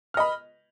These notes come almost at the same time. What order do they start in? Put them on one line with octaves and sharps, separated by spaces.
F6 D#5 B5